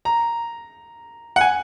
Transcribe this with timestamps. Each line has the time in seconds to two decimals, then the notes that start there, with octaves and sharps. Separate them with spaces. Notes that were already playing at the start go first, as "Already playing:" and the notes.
0.05 A#5
1.36 F#5
1.41 G#5